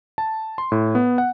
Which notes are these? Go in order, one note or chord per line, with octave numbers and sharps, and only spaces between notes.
A5
C6
A2
B3
F#5